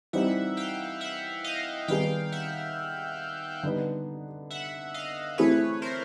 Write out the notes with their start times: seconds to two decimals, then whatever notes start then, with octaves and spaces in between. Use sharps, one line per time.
0.13 E3 G3 C4 D#4 E5 F#5
0.57 F5 G5
1.01 E5 F#5
1.44 D#5 F5
1.88 D#3 G3 B3 D#4 G#4 F5 G5
2.32 E5 F#5
3.63 D3 G3 B3 D#4
4.50 E5 F#5
4.94 D#5 F5
5.38 E3 A3 C4 E4 G#4 B4 C#5
5.82 A#4 C5